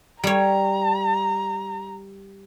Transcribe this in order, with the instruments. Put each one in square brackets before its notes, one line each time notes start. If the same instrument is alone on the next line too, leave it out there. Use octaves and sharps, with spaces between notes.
[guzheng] G3 C#5 [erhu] A#5